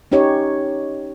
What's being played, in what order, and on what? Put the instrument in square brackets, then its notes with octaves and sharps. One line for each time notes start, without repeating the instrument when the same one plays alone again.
[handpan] C#4 D#4 G4 C#5